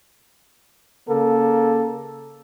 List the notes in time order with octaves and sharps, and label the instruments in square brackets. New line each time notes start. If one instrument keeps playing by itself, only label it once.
[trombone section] C#3 A#3 A4